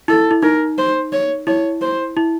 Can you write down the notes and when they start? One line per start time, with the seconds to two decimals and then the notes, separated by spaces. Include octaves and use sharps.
0.08 E4 A4
0.31 E4
0.43 D#4 A#4
0.78 C5
1.12 C#5
1.47 E4 C#5
1.81 C5
2.17 E4